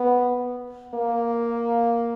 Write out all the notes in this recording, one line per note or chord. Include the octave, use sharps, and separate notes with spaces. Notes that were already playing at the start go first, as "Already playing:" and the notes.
Already playing: B3
A#3